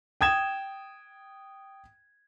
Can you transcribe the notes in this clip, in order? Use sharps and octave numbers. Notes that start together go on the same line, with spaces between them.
G5 D#6 G#6 E7